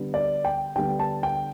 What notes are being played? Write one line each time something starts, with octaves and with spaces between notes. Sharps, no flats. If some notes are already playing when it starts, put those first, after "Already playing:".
Already playing: D3 G3 B3 D4
D5
G5
D3 G3 B3 D4 G5
A5
G5